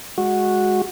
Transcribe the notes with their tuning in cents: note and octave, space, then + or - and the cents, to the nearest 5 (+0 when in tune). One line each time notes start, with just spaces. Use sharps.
G#3 -5 F#4 -10